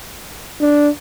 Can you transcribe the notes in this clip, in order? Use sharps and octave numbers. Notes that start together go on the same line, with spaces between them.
D4